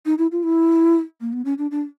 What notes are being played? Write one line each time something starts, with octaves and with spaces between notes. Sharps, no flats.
D#4
E4
F4
E4
A#3
B3
C#4
D4
D4